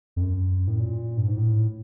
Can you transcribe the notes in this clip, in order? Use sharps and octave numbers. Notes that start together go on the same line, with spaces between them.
F2
F#2
A2
A#2
G2
G#2
A2